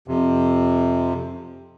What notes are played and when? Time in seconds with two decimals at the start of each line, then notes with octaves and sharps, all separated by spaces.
0.08 F2 C3